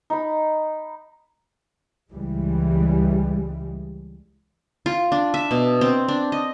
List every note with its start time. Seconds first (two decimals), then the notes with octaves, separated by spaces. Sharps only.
0.10 D#4 B5
2.10 C#2 E3 G3 G#3
4.86 F4
5.12 D4
5.34 E5
5.51 B2
5.81 C4
6.08 D4
6.32 D#5